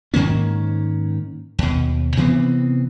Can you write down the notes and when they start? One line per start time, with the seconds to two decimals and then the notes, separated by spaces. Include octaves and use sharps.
0.14 G#2 D#3 A#3 C#4
1.59 D#2 B2
2.17 C3 E3 B3 C4